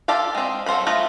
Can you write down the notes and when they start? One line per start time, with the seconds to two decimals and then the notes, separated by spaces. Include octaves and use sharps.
0.08 F4 G4 A4 D5 F5
0.35 G#3 C4
0.66 F#3 A4 C5 F5 B5
0.87 A3 F4 D#5 B5